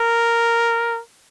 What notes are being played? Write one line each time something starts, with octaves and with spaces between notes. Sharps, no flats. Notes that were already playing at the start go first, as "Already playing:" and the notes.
Already playing: A#4